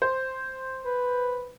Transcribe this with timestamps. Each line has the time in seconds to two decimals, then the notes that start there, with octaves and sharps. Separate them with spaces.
0.02 C5
0.84 B4